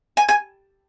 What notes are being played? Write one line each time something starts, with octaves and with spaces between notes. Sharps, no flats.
G#5
G#5